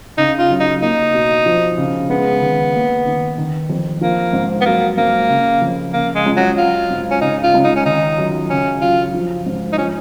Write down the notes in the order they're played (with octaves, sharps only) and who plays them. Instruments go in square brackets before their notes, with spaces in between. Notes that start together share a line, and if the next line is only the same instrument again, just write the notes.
[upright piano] C#3 [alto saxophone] D#4
[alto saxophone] F4
[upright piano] F#2
[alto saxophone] D#4
[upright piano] A#3 [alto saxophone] D#4
[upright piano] B2
F3
C#3
[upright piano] G#3 [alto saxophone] B3
[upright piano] D#3
A#3
D#3
D#3
F2
[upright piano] F3 [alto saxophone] A#3
[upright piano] G#2
[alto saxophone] B3
[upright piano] F#3 [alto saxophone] A#3
[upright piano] G#2 [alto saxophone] A#3
[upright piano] C#3
F2
[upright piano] C#3 [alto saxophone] A#3
[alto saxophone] G#3
[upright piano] C#2
[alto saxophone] F#3
[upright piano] F#3 [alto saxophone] F4
[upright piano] G#2
[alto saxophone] C#4
[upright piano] C#3 [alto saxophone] D#4
[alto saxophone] F4
[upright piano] C#2
[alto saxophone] D#4
C#4
[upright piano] D#3 [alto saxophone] D#4
[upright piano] F#2
[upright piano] C#3 [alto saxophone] C#4
[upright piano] F#2 [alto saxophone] F4
[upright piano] F3
G#2
[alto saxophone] D#4
[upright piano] F3 [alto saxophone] C#4